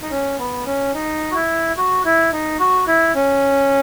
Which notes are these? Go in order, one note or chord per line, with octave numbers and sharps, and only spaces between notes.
D#4
C#4
B3
C#4
D#4
F#4
E4
F#4
E4
D#4
F#4
E4
C#4